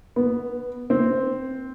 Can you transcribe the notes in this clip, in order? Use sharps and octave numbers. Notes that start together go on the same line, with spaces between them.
B3
C4